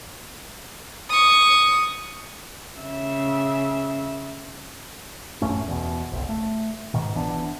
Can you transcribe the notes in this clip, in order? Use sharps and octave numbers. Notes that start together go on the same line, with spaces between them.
C#6 D#6
C#3 E5
A1 F#2 A3 C#4
E2 B2
F#1 C2
A3
G#2 B2 D#3
G1 E3 B3 D4